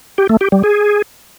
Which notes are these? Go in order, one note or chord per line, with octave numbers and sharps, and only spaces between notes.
G4
A3
G4
G3
G#4